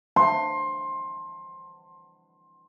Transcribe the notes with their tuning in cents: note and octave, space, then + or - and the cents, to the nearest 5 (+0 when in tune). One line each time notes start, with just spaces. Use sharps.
C6 +20